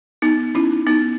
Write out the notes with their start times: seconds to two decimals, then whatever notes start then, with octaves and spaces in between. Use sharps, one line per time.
0.22 B3 D#4
0.55 C#4 E4
0.86 B3 D#4